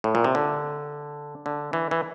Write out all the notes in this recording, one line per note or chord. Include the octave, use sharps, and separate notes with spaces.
A2
A#2
C3
D3
D3
E3
E3